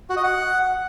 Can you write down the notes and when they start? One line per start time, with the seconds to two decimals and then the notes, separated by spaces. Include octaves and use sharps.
0.10 F#4
0.17 D#5
0.23 F#5